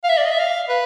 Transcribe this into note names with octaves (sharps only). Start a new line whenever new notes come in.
F5
E5
D5
D#5
E5
F5
B4